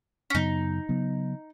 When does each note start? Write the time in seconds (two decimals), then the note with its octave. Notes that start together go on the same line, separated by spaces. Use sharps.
0.30 C#4
0.34 F#2 C#3 F#3 B3 D#4
0.89 C#3 F#3 B3